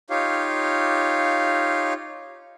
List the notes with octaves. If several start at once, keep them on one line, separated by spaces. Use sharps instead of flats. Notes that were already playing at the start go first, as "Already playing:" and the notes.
D#4 F4 G4 C#5 F5